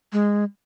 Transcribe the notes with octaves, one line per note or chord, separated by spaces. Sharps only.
G#3